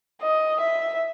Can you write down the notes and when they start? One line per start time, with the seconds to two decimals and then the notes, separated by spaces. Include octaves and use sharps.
0.21 D#5
0.60 E5